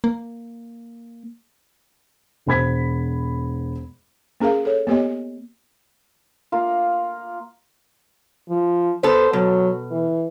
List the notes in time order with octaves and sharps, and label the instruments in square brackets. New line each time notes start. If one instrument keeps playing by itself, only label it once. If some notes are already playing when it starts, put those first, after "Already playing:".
[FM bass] A#3
[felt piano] E1 C5 B5 G#6 B6
[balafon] A#3 C#4 G#4 A#4 F5
A4 C#5
A#3 B3 G4 C#5 D#5
[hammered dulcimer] A#3 F4
[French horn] F3
[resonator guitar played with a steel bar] B3 A4 [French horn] C5
[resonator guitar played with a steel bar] B2 [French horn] F#3
[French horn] E3